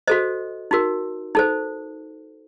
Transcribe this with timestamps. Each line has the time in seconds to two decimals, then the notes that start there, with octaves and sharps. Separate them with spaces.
0.08 F#4 A4 C5 D#5
0.71 D#4 F#4 A#4
1.35 D#4 A4 C5